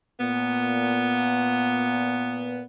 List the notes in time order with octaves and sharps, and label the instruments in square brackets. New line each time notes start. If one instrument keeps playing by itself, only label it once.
[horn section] A#2 B3